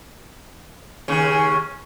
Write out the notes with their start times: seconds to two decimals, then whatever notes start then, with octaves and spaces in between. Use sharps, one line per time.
1.08 D#2 C#3